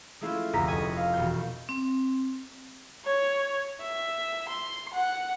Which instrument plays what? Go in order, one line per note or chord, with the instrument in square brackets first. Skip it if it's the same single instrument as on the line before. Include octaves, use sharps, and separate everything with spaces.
[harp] G#3 A3 C#4 E4 F4
F1 D2 A#5 A#6 B6
D#5 G#5 B5 C#6 D#6
B4 F5
E1 B2 F#4 G6
[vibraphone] C4
[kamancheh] C#5
E5
C6
F#5